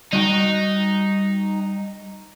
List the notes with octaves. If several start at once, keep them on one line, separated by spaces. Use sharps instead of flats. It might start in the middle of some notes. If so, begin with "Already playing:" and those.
G3 D#4 F#4 G5